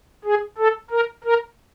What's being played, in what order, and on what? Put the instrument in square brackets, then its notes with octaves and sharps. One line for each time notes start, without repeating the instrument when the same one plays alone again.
[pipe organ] G#4
A4
A#4
A#4